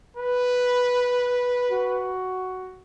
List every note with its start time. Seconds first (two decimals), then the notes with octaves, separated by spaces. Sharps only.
0.17 B4
1.69 F#4